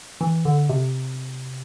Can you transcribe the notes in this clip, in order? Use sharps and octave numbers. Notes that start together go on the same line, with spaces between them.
E3
D3
C3